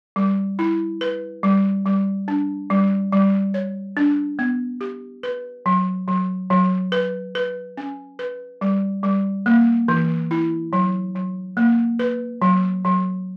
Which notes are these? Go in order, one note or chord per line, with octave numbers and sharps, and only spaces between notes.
G3
E4
B4
G3
G3
D4
G3
G3
C#5
D4
B3
G4
B4
F#3
F#3
F#3
B4
B4
C#4
B4
G3
G3
A#3
E3
E4
F#3
F#3
A#3
B4
F#3
F#3